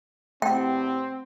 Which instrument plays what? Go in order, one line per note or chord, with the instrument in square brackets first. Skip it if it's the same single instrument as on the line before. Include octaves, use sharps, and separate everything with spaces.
[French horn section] E2 C3 [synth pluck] A3 F#5 A5 [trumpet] C4 [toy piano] G5